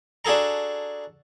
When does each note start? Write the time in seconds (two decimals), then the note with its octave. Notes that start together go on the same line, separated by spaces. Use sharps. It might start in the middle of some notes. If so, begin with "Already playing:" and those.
0.25 D4 F#4 G#4 A4 A#5